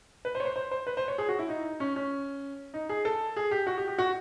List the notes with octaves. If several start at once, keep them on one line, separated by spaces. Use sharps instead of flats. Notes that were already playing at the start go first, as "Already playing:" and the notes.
B4
C5
C#5
C5
C5
C5
B4
C5
C#5
G#4
F#4
E4
D#4
C#4
C#4
D#4
G#4
A4
G#4
G4
F#4
G4
G4
F#4